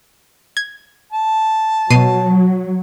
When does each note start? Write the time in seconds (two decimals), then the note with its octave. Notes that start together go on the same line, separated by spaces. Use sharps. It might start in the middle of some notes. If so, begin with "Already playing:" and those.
0.57 G#6
1.12 A5
1.90 B2 F#3 C7 D#7